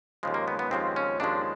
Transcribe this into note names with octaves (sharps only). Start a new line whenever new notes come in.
D#2 C#3 F3 G#3
A#3
B3
B3
D#2 C#3 F3 G#3 C4
C#4
D#2 C#3 F3 G#3 D4